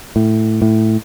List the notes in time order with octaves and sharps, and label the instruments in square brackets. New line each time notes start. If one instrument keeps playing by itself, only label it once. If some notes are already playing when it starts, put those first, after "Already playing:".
[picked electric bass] A2
A2